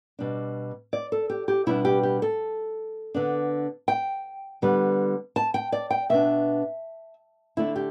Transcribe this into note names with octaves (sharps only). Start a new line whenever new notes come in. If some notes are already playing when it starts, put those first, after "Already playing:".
B2 G3 D4
D5
A4
G4
G4
B2 G3 B3 D4 E4
G4
G4
A4
D3 B3 D4
G5
D3 G3 B3
A5
G5
D5
G5
B2 B3 D4 E5
D3 A3 D4 E4
G4